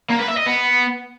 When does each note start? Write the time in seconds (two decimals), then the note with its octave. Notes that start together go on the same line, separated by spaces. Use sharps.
0.10 A#3
0.19 B4
0.28 E5
0.37 D#5
0.46 B3